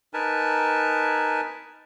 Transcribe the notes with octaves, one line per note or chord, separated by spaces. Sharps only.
D#4 A#4 B4 G#5 A5